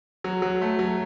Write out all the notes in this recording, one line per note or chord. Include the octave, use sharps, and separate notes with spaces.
F#3
F#3
A3
F#3